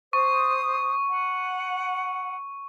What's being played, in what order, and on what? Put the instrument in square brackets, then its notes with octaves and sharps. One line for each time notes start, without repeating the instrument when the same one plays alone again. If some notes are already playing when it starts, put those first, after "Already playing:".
[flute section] C5 D#6 [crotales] C#6
[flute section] F#5